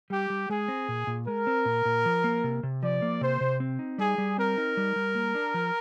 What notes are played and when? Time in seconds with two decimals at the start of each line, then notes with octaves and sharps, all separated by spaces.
0.10 G3 G4
0.30 G3
0.49 G#3 G#4
0.68 C4
0.88 A#2
1.07 A#2
1.27 G#3 A#4
1.47 C4
1.65 A#2
1.85 A#2
2.05 F3
2.24 A#3
2.44 C3
2.63 C3
2.82 F3 D5
3.02 A#3
3.21 C3 C5
3.41 C3
3.60 C4
3.79 D#4
3.98 G3 G#4
4.18 G3
4.38 C4 A#4
4.57 D#4
4.77 G3
4.96 G3
5.15 A#3
5.35 D4
5.54 F3